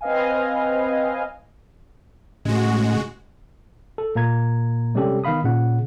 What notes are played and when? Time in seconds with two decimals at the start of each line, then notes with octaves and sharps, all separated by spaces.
0.01 C4 B4 D#5 F5 G#5
2.45 A2 C#3 G#3 F#4
3.98 A4
4.15 A#2 A#3 A#5 G#6
4.95 C3 G3 G#3 C#4 G4 A4
5.24 D#3 B3 F5 B5 D#6
5.44 A#2 C#3 F#5